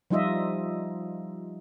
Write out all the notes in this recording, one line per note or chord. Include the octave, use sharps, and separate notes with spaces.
F3 G3 D#4 F4 D#5 E5